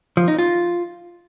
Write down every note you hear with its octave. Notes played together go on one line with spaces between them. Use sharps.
F3
D#4
F4